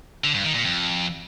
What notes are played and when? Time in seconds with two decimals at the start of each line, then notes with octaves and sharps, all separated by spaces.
0.24 D3
0.34 G2
0.44 D#3
0.55 A#2
0.65 F2